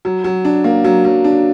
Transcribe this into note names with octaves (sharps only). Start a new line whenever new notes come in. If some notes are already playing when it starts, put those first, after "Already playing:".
F#3
F#3
D4
A#3
F#3
F#3
D4